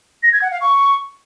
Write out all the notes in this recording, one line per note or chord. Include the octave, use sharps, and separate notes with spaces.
A#6
G#6
F#5
F5
C#6